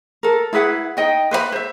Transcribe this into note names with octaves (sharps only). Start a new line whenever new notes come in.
A4 A#4
E4 G#4 B4 F#5
D#4 D#5 G5
B4 C5 D#5 B5
C5 E5